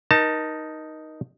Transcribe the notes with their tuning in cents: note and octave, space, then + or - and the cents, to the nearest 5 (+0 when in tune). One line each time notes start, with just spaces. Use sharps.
D#4 +0 A#4 +30 A5 +20